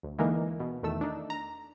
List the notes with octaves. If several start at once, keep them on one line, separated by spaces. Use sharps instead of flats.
D2
D3 E3 G#3 A#3 D#4 A#4
B2
E2 D#3 A3 E6
D4 D#4
A#5